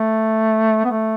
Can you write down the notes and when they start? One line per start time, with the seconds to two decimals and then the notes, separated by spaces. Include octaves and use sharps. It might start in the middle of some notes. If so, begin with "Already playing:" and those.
Already playing: A3
0.84 B3
0.91 A3